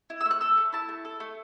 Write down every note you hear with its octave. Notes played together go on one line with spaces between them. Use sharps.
E4
E6
A3
F#6
A4 E6
A3
E4 A5
A3
A4
A3